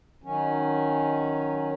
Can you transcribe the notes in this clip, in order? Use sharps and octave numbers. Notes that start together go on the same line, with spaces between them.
D#3 F#3 C#4